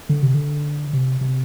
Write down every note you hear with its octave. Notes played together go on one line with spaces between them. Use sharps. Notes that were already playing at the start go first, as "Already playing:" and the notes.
D3
C3
D3
C3
C3